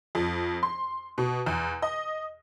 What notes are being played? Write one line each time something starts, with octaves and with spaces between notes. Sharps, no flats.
F2
C6
B2
E2
D#5